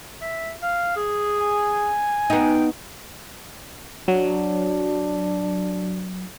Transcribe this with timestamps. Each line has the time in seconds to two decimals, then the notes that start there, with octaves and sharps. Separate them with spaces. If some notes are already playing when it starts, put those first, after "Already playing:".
0.21 E5
0.62 F5
0.96 G#4
1.42 G#5
2.30 B3 D#4 G5
4.08 F#3 D4